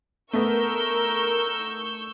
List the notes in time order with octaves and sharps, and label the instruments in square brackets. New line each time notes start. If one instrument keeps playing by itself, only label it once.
[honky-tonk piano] A3 B3 [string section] A#4 [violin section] C#6 E6 G6